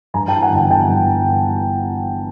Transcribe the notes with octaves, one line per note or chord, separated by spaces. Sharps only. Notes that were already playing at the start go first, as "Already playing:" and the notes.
G2 G#5 A#5
G5 A5
E3
F#5 G#5
G1 G5 A5
G1 G5 A5
G2